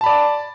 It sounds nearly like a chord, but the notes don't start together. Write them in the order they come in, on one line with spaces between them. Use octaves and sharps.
A5 B5 D5